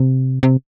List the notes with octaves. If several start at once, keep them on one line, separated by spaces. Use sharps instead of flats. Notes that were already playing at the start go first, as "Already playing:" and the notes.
Already playing: C3
C3